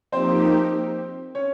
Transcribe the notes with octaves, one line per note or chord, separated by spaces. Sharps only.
F3 A#3 C4 D#4 G4 C5
C#4 C#5